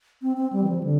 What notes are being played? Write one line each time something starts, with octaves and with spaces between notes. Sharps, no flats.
C4
C4
G3
E3
F3
D3